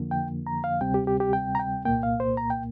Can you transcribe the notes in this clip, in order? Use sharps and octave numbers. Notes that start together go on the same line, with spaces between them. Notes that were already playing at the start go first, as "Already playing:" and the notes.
Already playing: F2 D3 F3 A#3
G5
A#5
F5
D2 C3 G3 C4 G5
G4
G4
G4
G5
A#5
G5
C2 A#2 A#3 G5
F5
C5
A#5
G5